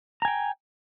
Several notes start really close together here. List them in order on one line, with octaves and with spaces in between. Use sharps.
A#5 G#5 G5